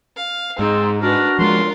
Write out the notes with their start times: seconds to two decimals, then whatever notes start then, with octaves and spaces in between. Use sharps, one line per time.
0.17 F5
0.59 G#2 C4 D#4 G#4
1.02 D4 F#4 A#4 B4
1.39 F3 G#3 F4 A#4 C6